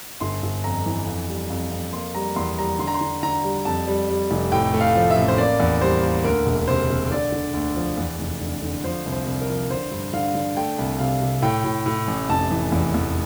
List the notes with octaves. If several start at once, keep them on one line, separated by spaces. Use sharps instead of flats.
G1 C6
G1
F2 A#5
E3
F2
G3
F2
F2
A#3 C6
G3 A#5
E2 C6
G3 A#5
D3 C6
A#5
C6
D3
D3 A#5
G3
F2 A5
G3
G3
F1
A2 G5
A3
F5
F3
E5
A1
C5
A#3 D5
E2
G3 C5
A#3
D2 A#4
E1
C3 C5
C3
D3 D5
D3
D2
F3
E2
F1
D3
D3
F3 C5
C2
C5
C2
A#4
F3
D3 C5
G2
D3 F5
D3
A3 G5
C2
C3 F5
C3
A2 G5
A2
A2
A1
F1 A5
E3
E2
E2